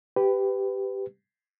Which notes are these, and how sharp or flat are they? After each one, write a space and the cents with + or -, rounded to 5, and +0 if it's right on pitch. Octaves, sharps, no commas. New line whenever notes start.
G4 +0 B4 +20